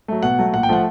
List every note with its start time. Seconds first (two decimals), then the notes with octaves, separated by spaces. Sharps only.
0.08 F#3 A3
0.23 B2 F#5
0.39 F#3 A3
0.53 A#2 F#5
0.63 G5
0.69 F3 A3 F#5